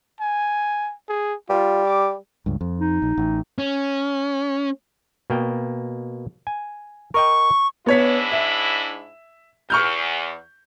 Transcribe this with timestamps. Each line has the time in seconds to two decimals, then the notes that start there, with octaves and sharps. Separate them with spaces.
0.20 G#5
1.09 G#4
1.50 G3 F4
1.85 D6
2.46 C#2 G2
2.61 F2
2.80 D#4
3.02 A#1
3.18 A1
3.58 C#4
5.30 B2 A#3 G5
6.47 G#5
7.14 A#4 D#5 G5 C#6
7.86 G#2 B3 D4 E4 C#5 B6
8.32 E5
9.70 E2 C#6 F6 G6